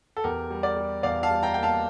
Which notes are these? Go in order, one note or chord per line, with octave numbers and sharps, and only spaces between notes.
A4
E2 G4 A#4
G3
A#4 D5
G3
E2 D5 F5
F5 A5
G3
G5 A#5
A#3 G5
F5 A5